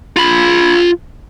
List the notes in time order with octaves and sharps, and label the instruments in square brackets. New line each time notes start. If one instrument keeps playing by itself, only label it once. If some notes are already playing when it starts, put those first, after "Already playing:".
[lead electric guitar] F4 B5